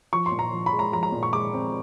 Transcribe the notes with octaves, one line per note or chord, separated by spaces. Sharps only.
F3 C#6
C6
A#2
A#5
F3
B5
G#3
A#5
F3 A#5
A#5
A#2
C#6
G#3 D6
C4